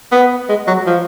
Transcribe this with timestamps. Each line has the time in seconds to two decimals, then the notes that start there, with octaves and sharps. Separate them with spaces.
0.12 B3
0.49 G#3
0.67 F#3
0.86 F3